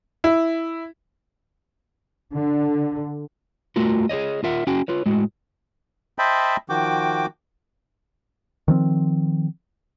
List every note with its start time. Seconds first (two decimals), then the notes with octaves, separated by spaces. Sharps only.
0.24 E4
2.34 D3
3.76 A3 F4 F#4 A#4
4.09 G#4 C5 C#5 D#5
4.44 F4 A#4 E5 F#5
4.67 C#4 F#4 G#4 G5 G#5
4.88 F4 B4 C#5
5.06 A2 G#3 F#4
6.18 C5 D#5 E5 G5 A5 B5
6.69 D#3 F3 F#4 G5 D6
8.68 D#3 F3 C4